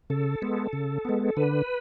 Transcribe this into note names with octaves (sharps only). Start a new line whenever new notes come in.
C#3 A4
G#3 B3
C#3
G#3 B3
D3 B4